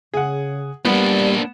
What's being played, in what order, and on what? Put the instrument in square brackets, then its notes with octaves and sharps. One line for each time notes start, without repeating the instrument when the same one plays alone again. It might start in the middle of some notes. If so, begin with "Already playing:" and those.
[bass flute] C#3 [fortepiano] G#4 F#5
[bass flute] G3 [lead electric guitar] A#3 D4 [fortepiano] B3